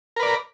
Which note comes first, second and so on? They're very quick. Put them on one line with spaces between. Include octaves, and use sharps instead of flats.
A#4 B4 D5